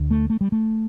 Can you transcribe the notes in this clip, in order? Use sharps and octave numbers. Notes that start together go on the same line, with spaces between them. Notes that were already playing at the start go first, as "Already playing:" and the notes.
Already playing: D2 D3
A3
A3
G3
A3